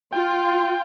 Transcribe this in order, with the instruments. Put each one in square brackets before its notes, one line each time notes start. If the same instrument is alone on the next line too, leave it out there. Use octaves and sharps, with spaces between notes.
[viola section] F4 [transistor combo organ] G5